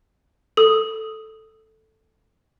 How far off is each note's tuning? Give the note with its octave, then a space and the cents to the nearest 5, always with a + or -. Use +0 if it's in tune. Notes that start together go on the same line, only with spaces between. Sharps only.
A4 +0 D#6 +0